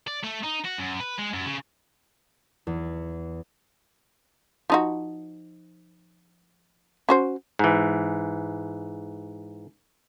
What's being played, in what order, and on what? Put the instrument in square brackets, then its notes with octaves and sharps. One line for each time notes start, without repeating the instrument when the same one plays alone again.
[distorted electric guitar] D5
A3
D#4
F#4
F#2
B4
G#3
F#2
C#3
[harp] E2
[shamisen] F3 D#4 F#4
C#4 F#4 C5
[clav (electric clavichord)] G#2 E3